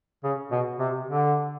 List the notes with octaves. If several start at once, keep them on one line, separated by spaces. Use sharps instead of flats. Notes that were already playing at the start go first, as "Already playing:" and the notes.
C#3
B2
C3
D3